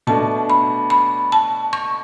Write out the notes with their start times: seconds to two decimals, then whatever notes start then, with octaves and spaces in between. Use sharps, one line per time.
0.07 B2 A3 D4 A5
0.50 B5
0.90 B5
1.32 A5
1.73 C#6